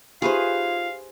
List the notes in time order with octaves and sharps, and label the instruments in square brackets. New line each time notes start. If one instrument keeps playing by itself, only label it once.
[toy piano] D#4 G4 E5 [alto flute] F4 [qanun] G#4 B4 C5 [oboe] F5